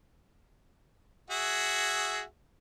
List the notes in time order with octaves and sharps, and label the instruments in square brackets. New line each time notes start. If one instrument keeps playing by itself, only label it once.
[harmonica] F#4 G#4 E5